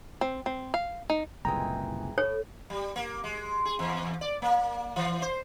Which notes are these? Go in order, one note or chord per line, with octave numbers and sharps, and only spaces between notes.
C4
C4
F5
D#4
F#1 C2 A#2 E3 G#3 G5 A#5
A2 C#5
G3
A#3
G#3
G#4
E2
D5
A#3
E3
C5